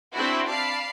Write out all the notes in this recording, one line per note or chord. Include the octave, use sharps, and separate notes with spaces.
C4 D4 E4 F#4
D5 F5 A5 B5 C7